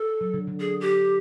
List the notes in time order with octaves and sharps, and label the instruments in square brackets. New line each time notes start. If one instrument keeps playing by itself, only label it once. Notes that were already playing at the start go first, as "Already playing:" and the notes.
Already playing: [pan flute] A4
[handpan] F#3
D3
D3
[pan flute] G#4
G4